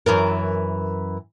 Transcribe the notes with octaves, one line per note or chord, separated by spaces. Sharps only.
F#2 E3 A#4